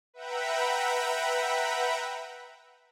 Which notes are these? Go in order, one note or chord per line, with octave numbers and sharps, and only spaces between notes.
B4 E5 F#5 G5 A#5 B5